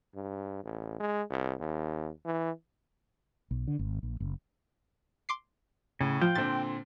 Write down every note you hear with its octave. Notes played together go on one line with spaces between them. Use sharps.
G2
A1
G#3
C2
D#2
E3
B1
D3
G#1
A#1
F#1
C6 D6 C7
A2 C#3
F3 F4 G5
A#2 D3 C4 A6